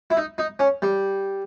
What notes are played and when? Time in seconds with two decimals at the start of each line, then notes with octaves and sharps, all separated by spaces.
0.10 E4
0.17 D#4
0.38 D#4
0.59 C#4
0.82 G3